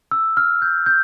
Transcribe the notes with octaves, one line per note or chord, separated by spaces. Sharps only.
E6
F6
G6
G6